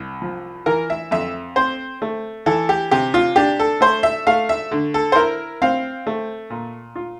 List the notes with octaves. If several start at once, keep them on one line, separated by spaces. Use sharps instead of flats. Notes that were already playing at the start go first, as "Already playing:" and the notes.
Already playing: C2
F3
E3 A#4
E5
F2 E5
C4 C5
A3
E3 A4
G4
C3 G4
F4
D4 G4
A4
A3 C5
E5
A3 F5
E5
D3
A4
C5
E4 A#4
C4 F5
A3
A#2
F4